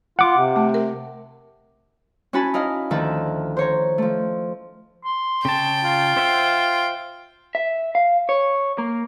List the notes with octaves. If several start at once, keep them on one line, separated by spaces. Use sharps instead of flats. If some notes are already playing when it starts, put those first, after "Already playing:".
F4 F#5 D6
C3
A3
A#4
C#4 E4 F#4 G#5 A5 B5
D#4 E4 D#5 F5
D2 D#3 F3 E5 A5
C5 C#5 A#5
F3 A3
C6
C#3 G5 A5
F4
C5 E5 F#5
E5
F5
C#5
A#3